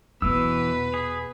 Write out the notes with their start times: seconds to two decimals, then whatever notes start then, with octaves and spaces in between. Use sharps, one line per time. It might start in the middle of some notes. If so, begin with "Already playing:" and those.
0.22 E2 B2 E3 B3 B4 E6
0.94 G#4